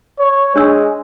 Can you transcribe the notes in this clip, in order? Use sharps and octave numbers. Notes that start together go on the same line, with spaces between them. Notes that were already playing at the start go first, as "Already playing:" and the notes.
C#5
G#3 D4 C#5 E6